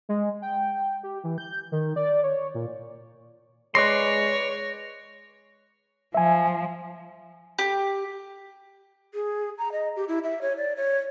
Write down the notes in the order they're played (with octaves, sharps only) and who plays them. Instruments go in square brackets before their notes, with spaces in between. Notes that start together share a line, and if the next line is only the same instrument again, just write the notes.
[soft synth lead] G#3
G5
G4
E3
G6
D#3
D5
C#5
A#2
[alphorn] G#3 [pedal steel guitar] B4 D5 C6 [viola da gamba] C#5 [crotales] A#6
[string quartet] F3 [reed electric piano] E5 G#5
[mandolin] G4
[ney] G#4
A#5
D#5
G4
E4
E5
C#5
D5
C#5